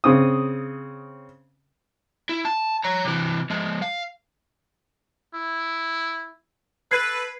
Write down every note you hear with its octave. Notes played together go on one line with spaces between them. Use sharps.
C#3 C4 D#6
E4
A5
C#5 A#5
C3 E3
F3 G#3
F5
E4
A4 B4 G#6 C7